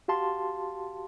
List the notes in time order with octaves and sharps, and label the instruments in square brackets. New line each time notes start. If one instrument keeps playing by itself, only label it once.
[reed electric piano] F#4 G4 F5 A5 C6